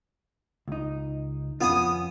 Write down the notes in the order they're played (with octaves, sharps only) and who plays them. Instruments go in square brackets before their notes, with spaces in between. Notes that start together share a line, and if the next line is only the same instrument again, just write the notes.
[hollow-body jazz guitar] C#2 D#4
[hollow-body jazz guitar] F2 C#4 F4 [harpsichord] B3 G#5 D#6